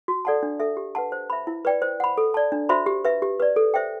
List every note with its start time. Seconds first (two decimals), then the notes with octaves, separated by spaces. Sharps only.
0.08 F#4
0.25 A4 D5 F#5 A5
0.43 D4
0.60 A4 E5
0.77 G4
0.95 B4 F#5 A5
1.12 C5
1.30 E5 B5
1.47 E4
1.65 B4 D5 G5
1.82 C5
2.00 F#5 B5
2.18 A4
2.34 D5 A5
2.52 D4
2.69 F#4 C5 E5 B5
2.86 G4
3.05 B4 E5
3.22 G4
3.40 B4 D5
3.56 A4
3.74 C5 E5 G5